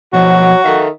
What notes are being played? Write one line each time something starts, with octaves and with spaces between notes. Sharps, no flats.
B2 F3 F#3 F#4 D#5
D#3 A4 E5 F5